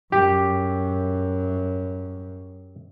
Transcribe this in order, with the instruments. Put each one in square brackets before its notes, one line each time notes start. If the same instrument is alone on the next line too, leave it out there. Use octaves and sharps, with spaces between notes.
[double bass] F#2 [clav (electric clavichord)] G4